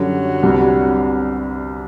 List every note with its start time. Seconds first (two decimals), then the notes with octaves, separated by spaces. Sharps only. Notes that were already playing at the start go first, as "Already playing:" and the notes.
Already playing: F#2 D3 F#3 G3
0.43 C2 C3 G3 B3 D4